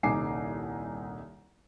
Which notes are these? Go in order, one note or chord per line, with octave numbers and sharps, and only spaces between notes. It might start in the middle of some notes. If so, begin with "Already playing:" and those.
D#1 C2 D#4 G#5 D6 C7